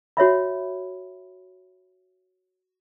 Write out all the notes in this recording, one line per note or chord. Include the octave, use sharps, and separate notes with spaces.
F#4 C#5 E5 B5